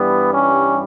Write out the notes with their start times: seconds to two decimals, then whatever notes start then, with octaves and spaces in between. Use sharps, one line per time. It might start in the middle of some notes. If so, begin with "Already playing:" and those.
Already playing: G2 E3 G3 B3
0.33 C#4